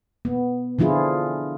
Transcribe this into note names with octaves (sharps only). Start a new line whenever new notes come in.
B3
D3 F3 E4 F4 G#4